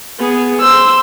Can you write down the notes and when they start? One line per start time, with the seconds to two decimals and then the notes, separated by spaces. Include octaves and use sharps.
0.19 B3 G#4
0.61 C5 E6